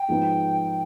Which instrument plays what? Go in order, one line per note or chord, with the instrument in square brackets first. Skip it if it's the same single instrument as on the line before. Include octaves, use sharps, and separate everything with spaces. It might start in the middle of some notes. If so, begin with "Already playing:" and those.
Already playing: [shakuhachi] G5
[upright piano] G#2 F3 G#3 B3 D#4